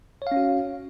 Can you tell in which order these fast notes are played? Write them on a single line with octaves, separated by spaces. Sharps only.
C#5 F5 C#4 F#4